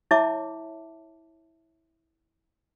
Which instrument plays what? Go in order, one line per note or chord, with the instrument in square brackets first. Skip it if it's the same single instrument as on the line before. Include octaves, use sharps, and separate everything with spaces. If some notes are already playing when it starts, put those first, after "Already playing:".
[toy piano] E4 C#5 E5 A5 D6